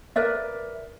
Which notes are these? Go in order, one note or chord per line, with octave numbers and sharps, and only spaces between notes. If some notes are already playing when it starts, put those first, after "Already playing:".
A#4 B4 D5 E5